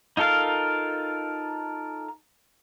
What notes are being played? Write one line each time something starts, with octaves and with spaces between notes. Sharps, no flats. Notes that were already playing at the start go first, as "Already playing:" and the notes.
D#4 F4 A4 A#4 F5